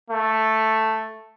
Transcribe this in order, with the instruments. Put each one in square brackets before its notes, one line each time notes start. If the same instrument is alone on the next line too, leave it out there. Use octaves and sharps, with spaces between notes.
[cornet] A3